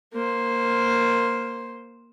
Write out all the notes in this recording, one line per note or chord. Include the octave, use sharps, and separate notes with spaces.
A#3 C5